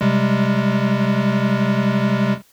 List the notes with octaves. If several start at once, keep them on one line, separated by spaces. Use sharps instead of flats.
C3 G3 G#3